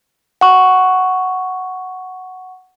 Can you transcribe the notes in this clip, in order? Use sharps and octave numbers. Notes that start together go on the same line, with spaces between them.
F#5 C#6